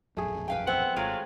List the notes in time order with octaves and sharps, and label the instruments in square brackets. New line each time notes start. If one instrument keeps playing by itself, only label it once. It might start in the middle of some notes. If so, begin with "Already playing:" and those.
[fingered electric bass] E1 A#1 F#2 [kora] A3 G#4
[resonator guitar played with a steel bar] B4 F5 G5
[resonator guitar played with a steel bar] B3 [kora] C4 [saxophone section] C5 E5 F#5
[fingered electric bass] G#1 [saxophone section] F#3 F4 [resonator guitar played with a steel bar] G#3 A3